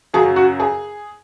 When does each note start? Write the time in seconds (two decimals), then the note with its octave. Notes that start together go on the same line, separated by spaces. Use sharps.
0.14 F#2 C#3 F#3 G#4
0.36 F#4
0.60 G#4